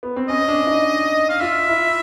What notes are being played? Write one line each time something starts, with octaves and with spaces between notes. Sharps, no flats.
B3
C4
C#4 D#5
D4
D#4
F5
F4 E5
E4